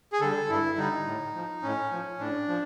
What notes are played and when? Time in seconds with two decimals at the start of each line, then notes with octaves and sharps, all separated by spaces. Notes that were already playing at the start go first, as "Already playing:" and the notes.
0.13 G#4
0.21 D3 G3 A4
0.49 G2 E4
0.78 D3 G3 D#4
1.06 A2
1.35 F3
1.63 A2 C#4
1.92 F3
2.19 A2 D4
2.48 F3